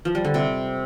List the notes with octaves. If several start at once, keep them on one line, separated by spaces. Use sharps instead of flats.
F3
G3
D3
C3